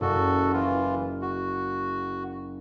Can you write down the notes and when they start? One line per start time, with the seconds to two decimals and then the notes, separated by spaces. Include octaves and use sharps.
0.01 F#1 F#4 A4
0.53 E3 F4
1.22 F#4